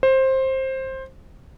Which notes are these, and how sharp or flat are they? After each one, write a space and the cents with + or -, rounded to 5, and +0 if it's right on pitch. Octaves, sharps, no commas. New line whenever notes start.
C5 +15